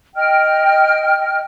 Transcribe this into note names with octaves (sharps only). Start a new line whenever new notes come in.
D#5 G5 F6